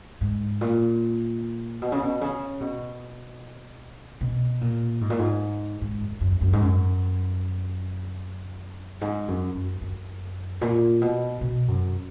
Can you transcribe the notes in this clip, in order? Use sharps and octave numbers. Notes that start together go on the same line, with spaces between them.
G#2
A#2
B2
C#3
B2
C#3
B2
B2
A#2
G#2
A#2
G#2
G#2
F#2
F#2
F#2
G#2
F#2
G#2
F#2
F#2
F#2
A#2
B2
B2
F#2